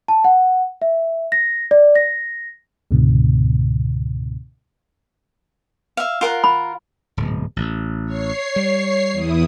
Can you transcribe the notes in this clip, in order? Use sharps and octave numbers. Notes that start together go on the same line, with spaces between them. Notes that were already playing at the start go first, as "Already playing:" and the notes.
A5
F#5
E5
A#6
D5
A#6
C#2 G#2 B2 D3
E5 F5
F4 A#4 F#5
B5
D1 G#2 B2
A1
C#5 C7
G3
E2 E4 D#6